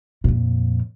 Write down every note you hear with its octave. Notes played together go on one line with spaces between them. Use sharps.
F2 A#2